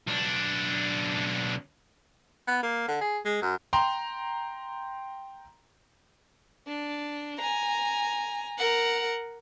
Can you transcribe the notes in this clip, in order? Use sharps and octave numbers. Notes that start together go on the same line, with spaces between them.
B1 D4
B3
A#3
D3
G#4
G#3
F#2
G5 A#5 C6
D4
G#5 A#5
A#4 F#5